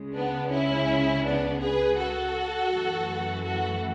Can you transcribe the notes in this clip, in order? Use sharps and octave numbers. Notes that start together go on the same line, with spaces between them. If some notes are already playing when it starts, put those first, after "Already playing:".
Already playing: C#2 C#3 G#3
B3 D4
C#4 E4
B3 D4
G#4 B4
F#4 A4
F#2 E3 A3
F#4 A4